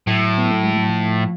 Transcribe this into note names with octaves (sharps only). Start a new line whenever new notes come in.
A2 F#3
B3
A3
G#3
F#3
F3